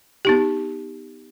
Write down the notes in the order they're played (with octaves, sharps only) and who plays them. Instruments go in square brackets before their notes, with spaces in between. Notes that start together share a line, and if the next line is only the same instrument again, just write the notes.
[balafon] B3 D#4 G4